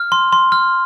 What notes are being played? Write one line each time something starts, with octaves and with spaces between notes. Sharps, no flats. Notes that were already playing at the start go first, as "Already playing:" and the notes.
Already playing: F6
C6
C6
F6